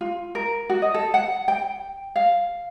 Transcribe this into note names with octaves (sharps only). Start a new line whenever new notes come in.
F4
A#4
F#4
D#5
A4
F#5
G5
F5